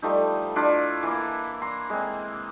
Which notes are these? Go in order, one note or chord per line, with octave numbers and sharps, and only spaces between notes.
F3 G3 A3 D#4
D4 E4 F4 D5
E3 A#3
A#5 C6
G#3 C4